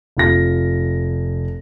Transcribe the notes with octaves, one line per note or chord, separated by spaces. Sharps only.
F1 F4 A#6